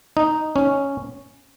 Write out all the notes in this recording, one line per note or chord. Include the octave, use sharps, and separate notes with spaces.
D#4
C#4